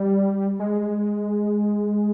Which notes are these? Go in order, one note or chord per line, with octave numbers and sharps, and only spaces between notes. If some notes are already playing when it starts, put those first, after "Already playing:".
Already playing: G3
G#3